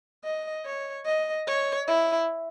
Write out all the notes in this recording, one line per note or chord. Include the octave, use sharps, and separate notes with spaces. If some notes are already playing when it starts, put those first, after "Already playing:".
D#5
C#5
D#5
C#5
E4